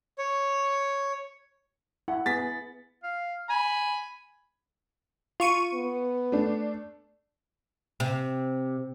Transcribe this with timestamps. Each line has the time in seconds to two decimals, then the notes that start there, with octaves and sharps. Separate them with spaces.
0.18 C#5
2.08 E4 F#5
2.26 B3 G#4 A6 B6
3.03 F5
3.50 G#5 B5
5.40 F4 C#6 D#7
5.74 B3
6.32 A3 D4
8.00 C3